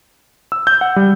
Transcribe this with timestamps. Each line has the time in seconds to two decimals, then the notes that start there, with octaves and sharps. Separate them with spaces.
0.52 E6
0.67 G6
0.81 F#5
0.96 G3